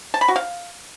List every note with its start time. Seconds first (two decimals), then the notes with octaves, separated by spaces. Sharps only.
0.14 A5
0.21 B5
0.28 F#4
0.36 F5